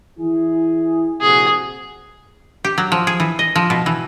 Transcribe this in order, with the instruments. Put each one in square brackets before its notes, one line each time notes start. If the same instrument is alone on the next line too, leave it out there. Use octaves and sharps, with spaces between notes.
[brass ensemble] E3 E4 G#4
[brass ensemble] A#1 C3 F#4 [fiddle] G#4
[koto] G4
F#3
F3
G#4
E3
D#5
F3
B2
E3